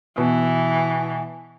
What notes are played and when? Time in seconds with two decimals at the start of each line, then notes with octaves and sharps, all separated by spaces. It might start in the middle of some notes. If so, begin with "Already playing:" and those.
0.18 B2 E3